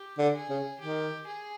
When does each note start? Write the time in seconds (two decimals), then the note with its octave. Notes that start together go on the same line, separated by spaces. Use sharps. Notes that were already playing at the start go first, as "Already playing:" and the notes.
Already playing: G4
0.18 D3
0.33 G#4
0.50 C#3
0.80 D#3 G4
1.27 G#4